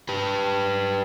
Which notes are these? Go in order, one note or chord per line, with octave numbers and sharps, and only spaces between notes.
G4 B4